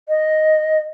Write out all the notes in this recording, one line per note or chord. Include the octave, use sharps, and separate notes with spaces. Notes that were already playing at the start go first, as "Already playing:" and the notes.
D#5